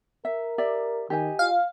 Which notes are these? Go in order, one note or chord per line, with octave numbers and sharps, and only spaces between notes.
A#4 E5
G4 D5 E5
D#3 G4 D#5 G#5
F4 F5